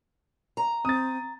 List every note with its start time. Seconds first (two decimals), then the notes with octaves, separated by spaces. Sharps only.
0.57 A#5
0.85 C4 D#6 A6